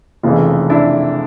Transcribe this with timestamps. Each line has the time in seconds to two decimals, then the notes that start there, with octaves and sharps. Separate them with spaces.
0.23 F1 F2 C#3 E3 D#4 F4
0.70 D4 E4